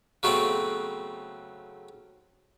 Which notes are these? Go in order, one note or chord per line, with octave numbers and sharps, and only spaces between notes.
C#3 F#3 A3 B3 C4